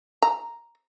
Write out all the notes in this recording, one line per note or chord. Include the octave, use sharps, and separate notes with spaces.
A#5